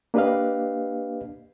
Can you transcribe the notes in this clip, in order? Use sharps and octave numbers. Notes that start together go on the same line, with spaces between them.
A#3 D4 G4 B4 D#5 F5